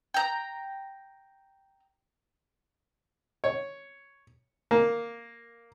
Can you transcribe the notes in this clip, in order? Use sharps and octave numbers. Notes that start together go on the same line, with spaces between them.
G5 A#5
C#5
A#3